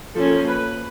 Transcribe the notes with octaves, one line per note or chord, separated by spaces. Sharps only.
F3 A#3 C#4 A4
B4